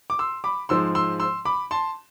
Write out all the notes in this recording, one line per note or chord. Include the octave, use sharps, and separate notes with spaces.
D6
C6 E6
B5 D6
G#2 F3 G#3 C6 E6
C6 E6
C6 E6
B5 D6
A5 C6